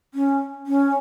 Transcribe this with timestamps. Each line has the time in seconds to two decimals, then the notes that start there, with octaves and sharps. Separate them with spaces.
0.14 C#4
0.67 C#4